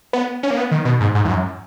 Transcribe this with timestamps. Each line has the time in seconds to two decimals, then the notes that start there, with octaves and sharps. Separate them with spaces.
0.13 B3
0.43 C#4
0.50 A#3
0.57 B3
0.71 D#3
0.85 B2
1.00 G#2
1.15 G#2
1.24 E2
1.29 F#2